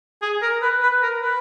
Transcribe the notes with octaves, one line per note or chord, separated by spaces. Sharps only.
G#4
A#4
B4
B4
A#4
B4